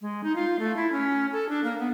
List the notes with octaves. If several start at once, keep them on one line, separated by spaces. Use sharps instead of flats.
G#3
D#4
F4
A3
E4
C#4
A4
D4
A#3
B3